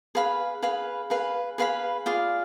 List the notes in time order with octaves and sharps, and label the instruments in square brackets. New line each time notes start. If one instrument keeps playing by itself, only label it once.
[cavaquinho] G#4 B4 F5 B5
G#4 B4 F5 B5
G#4 B4 F5 B5
G#4 B4 F5 B5
F4 G#4 D5 F5